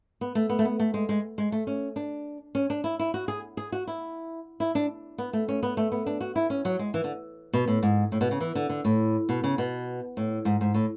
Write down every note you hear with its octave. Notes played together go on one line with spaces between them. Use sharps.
B3
A3
B3
A3
B3
A3
G#3
G#3
G#3
A3
C#4
D4
C#4
D4
E4
E4
F#4
G#4
G#4
F#4
E4
E4
D4
B3
A3
C#4
B3
A3
B3
D4
F#4
E4
C#4
F#3
G#3
E3
D3
B2
A2
G#2
A2
B2
C#3
E3
D3
D3
A2
B2
C#3
B2
A2
G#2
G#2
A2